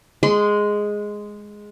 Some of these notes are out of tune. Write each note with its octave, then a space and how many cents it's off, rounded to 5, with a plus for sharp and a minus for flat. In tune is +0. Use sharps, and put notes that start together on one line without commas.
G#3 +0 C6 -30